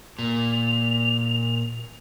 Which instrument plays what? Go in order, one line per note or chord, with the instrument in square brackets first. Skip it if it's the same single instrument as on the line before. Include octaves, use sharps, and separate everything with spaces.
[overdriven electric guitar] A#2 [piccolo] F7